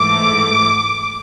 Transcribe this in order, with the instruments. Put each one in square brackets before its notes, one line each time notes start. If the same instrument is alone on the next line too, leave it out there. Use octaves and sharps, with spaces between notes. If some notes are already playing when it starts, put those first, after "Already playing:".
Already playing: [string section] G#2 E3 A3 D6